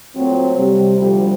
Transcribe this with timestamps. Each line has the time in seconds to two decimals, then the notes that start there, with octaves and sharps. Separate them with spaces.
0.15 A#2 F#3 A3 C4
0.57 C3 G3
0.98 D2 F3 G3